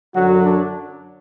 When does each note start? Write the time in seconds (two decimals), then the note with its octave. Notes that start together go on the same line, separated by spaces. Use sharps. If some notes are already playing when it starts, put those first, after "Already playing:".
0.15 F#2 D3 F#3 F#4
0.43 D4